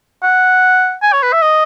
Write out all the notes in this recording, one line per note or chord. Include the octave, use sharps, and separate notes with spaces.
F#5
G#5
C#5
B4
E5
D#5